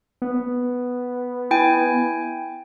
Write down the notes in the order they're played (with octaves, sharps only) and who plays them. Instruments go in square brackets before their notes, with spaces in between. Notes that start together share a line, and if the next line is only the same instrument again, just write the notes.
[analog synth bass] B3
[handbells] E4 G5 G#5